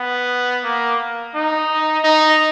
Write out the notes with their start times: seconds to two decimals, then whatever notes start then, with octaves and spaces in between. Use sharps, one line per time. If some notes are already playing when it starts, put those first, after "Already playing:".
Already playing: B3
0.64 A#3
1.35 D#4
2.04 D#4